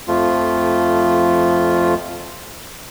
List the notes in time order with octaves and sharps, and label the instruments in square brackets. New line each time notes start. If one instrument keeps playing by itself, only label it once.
[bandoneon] F2 F3 A3 F4